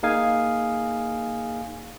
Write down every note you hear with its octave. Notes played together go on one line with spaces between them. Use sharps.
A#3 D#4 G#4 F5 G#5